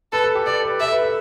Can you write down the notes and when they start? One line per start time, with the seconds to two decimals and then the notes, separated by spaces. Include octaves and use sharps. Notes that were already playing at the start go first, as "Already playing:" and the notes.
0.13 A4 B4
0.24 A4
0.35 G4
0.46 A4 D5
0.64 B4
0.80 A4 E5
0.92 B4
1.03 A4